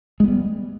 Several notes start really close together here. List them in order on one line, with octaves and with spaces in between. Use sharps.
G#3 B3 G3